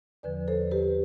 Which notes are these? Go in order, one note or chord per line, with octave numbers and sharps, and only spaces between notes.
E2 D3 F3 B4 D5
A4 C5
G4 B4